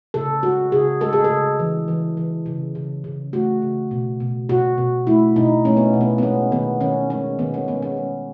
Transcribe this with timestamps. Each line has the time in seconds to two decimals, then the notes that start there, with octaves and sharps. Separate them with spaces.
0.14 C#3 A4
0.43 G#3 F#4
0.72 C#3 G#4
1.01 G#3 A4
1.13 G#4
1.24 A4
1.30 C#3
1.59 E3
1.88 E3
2.17 E3
2.46 C#3
2.75 C#3
3.04 C#3
3.33 A3 F#4
3.62 C#3
3.91 B2
4.20 B2
4.49 B2 F#4
4.78 B2
5.07 A3 E4
5.36 B2 D#4
5.65 A3 C#4
5.77 B3
5.94 B2
6.01 B3
6.18 B3
6.23 G#3 C#4
6.52 D#3 B3
6.81 D#3 C#4
7.10 G#3 C#4
7.39 D#3 B3
7.54 C#4
7.68 G#3 B3
7.82 C#4
7.97 G#3